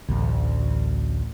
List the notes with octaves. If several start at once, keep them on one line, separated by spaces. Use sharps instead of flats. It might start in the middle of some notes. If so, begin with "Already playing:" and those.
A1 D2